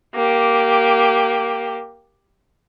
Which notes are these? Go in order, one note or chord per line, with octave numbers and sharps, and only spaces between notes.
A#3 G4